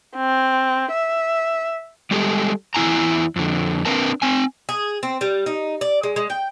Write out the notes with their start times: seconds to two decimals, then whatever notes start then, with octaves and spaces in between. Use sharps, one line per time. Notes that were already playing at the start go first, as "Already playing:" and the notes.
0.16 C4
0.92 E5
2.11 G3 G#3 G4 A4
2.75 E2 C3 E4 G#5 A#5
3.36 F2 D3
3.85 C4 D4 A#4 B4 A5
4.22 C4 G#5
4.69 G#4
5.03 C4
5.21 G3
5.46 D#4
5.81 D5
6.03 G#3
6.16 G#3
6.30 G5